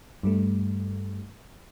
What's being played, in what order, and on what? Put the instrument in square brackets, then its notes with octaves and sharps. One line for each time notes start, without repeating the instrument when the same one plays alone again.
[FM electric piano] G2 G3 A3